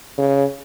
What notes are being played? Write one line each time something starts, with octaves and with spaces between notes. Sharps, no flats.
C#3